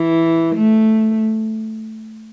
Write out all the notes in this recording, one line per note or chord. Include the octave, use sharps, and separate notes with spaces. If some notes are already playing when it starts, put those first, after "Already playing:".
Already playing: E3
A3